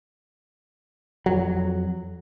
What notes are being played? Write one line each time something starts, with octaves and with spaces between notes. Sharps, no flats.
F2 F#3